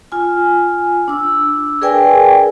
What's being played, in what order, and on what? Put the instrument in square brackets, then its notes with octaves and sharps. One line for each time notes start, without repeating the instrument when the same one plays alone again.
[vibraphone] F4 G#5
D4 E6
G#4 A#4 B4 D5 G5 G#5